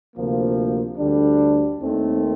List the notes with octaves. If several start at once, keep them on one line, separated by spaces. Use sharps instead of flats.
D2 C3 F3 A#3
D2 D3 G3 D4
D#2 D#3 A3 C4